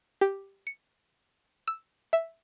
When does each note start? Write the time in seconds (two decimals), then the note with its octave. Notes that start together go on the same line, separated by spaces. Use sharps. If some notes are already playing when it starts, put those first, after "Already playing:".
0.21 G4
0.67 C#7
1.68 E6
2.13 E5